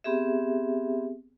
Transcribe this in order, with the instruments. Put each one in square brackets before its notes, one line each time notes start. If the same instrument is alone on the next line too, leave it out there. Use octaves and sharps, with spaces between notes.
[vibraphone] B3 C4 G4 G#4 E5